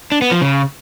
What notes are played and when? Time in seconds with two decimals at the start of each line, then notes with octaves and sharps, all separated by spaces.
0.12 D4
0.22 B3
0.31 F3
0.41 C#3